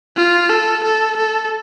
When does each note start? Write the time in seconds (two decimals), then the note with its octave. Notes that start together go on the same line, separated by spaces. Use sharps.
0.16 F4
0.50 A4
0.83 A4
1.17 A4